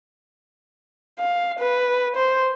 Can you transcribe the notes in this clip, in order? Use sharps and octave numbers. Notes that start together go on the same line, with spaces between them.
F5
B4
C5